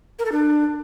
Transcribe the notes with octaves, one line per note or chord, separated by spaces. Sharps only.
A#4
A4
D4